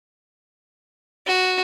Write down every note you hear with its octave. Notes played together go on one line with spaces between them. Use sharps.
F#4